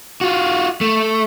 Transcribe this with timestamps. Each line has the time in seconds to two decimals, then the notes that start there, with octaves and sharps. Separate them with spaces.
0.21 F4 F#4
0.81 A3